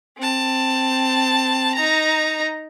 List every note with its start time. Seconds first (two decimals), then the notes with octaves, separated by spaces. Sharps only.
0.17 C4 A5
1.75 D#4 A#5